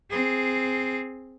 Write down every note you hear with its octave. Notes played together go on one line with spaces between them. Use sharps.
C4 G#4